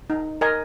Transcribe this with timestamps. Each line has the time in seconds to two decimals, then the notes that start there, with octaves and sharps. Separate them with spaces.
0.10 D#4
0.41 A#4 D#5 G#5